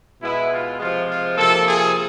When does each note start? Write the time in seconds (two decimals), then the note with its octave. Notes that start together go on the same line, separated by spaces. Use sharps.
0.22 B2 G#3 B3 E4
0.52 F4
0.79 C3 F3 G#3 F4
1.08 F4
1.37 C3 F3 A#3 A4
1.66 G#4